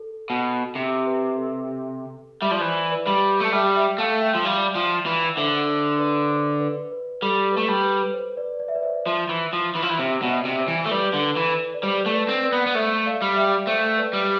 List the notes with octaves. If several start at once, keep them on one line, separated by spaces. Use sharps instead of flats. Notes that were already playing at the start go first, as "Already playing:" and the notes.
Already playing: A4
B2
C3 G4
B4
A4
G3 E5
F3 D5
E3 C5
B4 D5
G3
A3 A5
G3 E5 G5
E5 G5
A3 F5 A5
E5 G5
F3
G3 D5 F5
F3
E3
D3 C5 E5
C5
B4 D5
C5
B4
B4
G3 A4
A3 B4
G3
B4
B4
C5
B4 D5
D5
E5
B4 D5
C5 E5
F3 C5 E5
E3
F3
E3
F3
E3
C3 C5 E5
B2 D5
C5 E5
C3
C5 E5
E3
A3
G3 B4 D5
D3
B4
A4
E3 B4
B4
D5
G3 C5
A3
B4 D5
C4
B4 D5
B3
B3
A3 C5 E5
D5 F5
G3
E5 G5
A3 C5 E5
B4 D5
G3